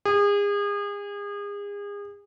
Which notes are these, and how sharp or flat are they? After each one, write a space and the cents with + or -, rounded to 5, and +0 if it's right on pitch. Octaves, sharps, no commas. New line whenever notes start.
G#4 -35